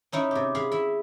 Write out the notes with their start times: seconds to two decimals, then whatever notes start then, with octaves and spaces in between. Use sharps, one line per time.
0.12 C#4 D#4 E4
0.31 C3 G4
0.55 G#4 F5 B5
0.72 E4 E5